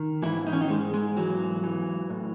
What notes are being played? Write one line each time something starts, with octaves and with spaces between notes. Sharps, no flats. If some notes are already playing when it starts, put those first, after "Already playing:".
Already playing: D#3
G#2 E3 E4
D#4
C#4
D#3 D#4
G#2 G#3
G#3
E3 F#3
E3
A2